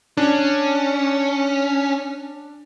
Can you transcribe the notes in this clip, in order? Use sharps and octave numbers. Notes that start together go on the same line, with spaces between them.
C#4 D4